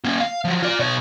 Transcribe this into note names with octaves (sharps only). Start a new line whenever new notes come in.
A#3 C#4
F5
F3 F#3
F4 D5
B2 C#5